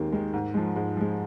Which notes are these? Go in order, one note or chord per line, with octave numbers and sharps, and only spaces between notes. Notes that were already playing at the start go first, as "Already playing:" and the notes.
Already playing: D#2 D#3 G#3 A#3 C4
D#3 G#3
G#2
F3 G#3
G#2 G#3
F3 G#3